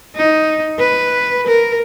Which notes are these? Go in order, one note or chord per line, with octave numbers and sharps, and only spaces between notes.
D#4
B4
A#4